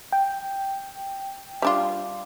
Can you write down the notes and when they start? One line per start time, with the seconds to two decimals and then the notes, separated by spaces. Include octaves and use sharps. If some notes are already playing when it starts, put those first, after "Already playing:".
0.12 G5
1.62 G3 D4 F4